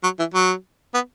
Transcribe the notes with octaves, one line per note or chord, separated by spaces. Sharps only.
F#3
E3
F#3
B3